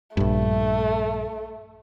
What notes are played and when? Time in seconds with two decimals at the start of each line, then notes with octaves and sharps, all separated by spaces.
0.17 A#1 G2 A3